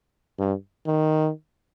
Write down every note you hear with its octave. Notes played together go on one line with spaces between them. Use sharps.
G2
D#3